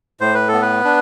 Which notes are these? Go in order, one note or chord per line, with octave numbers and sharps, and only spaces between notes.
A2 C5
B4
B3 A4
B4
D4